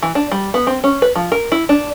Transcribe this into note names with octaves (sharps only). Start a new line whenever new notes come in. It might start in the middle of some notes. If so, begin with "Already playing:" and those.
E3
D4
G3
B3
C4
C#4
B4
F3
A#4
E4
D4